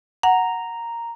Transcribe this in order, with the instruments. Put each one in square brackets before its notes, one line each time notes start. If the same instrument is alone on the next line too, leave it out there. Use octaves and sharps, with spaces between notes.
[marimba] F#5 [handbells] A#5